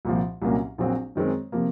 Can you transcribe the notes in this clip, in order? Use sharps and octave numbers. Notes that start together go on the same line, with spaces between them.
C2 A#2 F3
C2 A#2 F#3 A#3 C#4
A#1 A#2 F#3 C4 F#4
F#2 D#3 G#3 C4
C3 F3 A#3